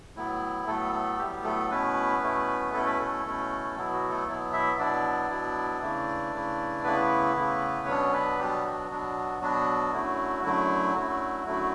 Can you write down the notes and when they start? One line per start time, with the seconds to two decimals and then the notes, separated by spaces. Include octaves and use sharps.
0.15 A2 F#3 B3 E4
0.67 A2 F#3 A3 B3 A4
0.93 A3 A4
1.19 A2 F#3 G3 B3 G4
1.44 A3 A4
1.70 B2 A3 B3 C#4 E4 B4
2.21 B2 A3 C#4 E4
2.73 B2 A3 C#4 E4 A4
2.86 B4
2.99 A3 A4
3.25 B2 A3 C#4 E4
3.76 B2 F#3 B3 E4
3.93 F#4
4.10 A3 A4
4.28 B2 F#3 B3 E4
4.53 E4 E5
4.78 B2 F#3 B3 D4 E4 D5
5.30 B2 F#3 B3 E4
5.81 C#3 E3 A3 E4
6.33 C#3 E3 A3 E4
6.84 C#3 E3 A3 B3 E4 B4
7.36 C#3 E3 A3 E4
7.86 B2 F#3 B3 C#4 D4 C#5
8.12 B3 B4
8.38 B2 F#3 G3 B3 D4 G4
8.65 F#4
8.90 B2 F#3 B3 D4
9.41 B2 F#3 B3 D4 F#4
9.93 F#2 D3 F#3 A3 E4
10.44 F#2 D3 F#3 A3 E4
10.96 F#2 D3 F#3 A3 E4 F#4
11.47 F#2 D3 F#3 A3 E4